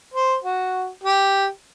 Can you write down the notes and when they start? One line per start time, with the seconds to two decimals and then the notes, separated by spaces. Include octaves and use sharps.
0.14 C5
0.44 F#4
1.04 G4